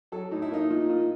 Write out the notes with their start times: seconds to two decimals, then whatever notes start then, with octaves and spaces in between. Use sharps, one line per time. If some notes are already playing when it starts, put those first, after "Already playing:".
0.12 F#3 A4
0.31 A2 D#4
0.42 E4
0.51 A#3 D#4
0.70 A#2
0.89 A#2